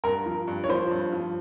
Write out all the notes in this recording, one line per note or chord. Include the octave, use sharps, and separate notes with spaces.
G2 A#4
F3
G2
C#5
F3 C5
G2
F3